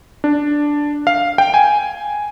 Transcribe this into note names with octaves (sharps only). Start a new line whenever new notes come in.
D4
F5
G5
G#5